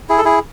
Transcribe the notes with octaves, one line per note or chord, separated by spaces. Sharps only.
E4 G#4
A4
E4 G#4